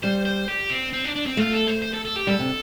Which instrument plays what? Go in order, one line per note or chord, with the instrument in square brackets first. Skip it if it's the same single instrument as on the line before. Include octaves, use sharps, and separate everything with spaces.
[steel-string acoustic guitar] G3 [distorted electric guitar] C5
[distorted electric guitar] C5
G4
C4
C4
D4
D4
C4
[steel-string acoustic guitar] A3 [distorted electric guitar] F4
[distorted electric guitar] A4
C5
C5
A4
A4
G4
[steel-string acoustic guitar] G3 [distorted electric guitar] A4
[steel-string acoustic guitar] C3